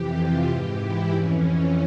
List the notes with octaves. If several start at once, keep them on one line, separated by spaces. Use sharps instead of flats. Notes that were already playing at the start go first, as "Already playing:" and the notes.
Already playing: F2 C3 E3 G4
F4
G#2 E3 G4
E4
F2 E3 C#4
C#4